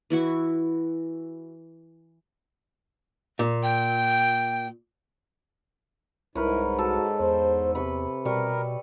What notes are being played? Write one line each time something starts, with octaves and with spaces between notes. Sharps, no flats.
E3 E4 F#4 C#6
A#2
G5
C2 G#2 E4 A#4 B4 C#5
F#4 A4
E2 C5
C3 B4 B5 C#6
B2 G3 A#4 B4 C#6